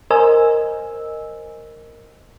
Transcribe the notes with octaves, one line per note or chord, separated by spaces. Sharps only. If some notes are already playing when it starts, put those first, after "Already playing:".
A#4 C5 D#5 G#5 E6